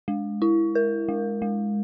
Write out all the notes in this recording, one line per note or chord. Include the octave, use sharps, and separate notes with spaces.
G#3
E4
A#4
G#3
G#3